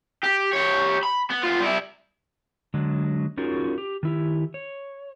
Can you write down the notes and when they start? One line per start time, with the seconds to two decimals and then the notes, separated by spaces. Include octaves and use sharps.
0.24 G4
0.53 G4 C#5
1.03 B5
1.30 B3
1.43 B3 F4
1.60 G3 E4
2.74 D3 F#3 G#3 D4
3.37 C#4 D#4 F4 F#4 G#4 A#4
3.78 G4
4.03 D#3 E4 G4
4.54 C#5